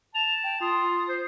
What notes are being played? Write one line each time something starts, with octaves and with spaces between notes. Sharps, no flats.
A5 F7
G5
F4 D#6
C5